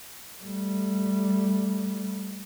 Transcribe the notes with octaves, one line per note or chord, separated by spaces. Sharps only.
G3 A3